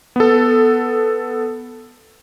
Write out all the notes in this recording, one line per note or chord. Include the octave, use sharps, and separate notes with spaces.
B3 A4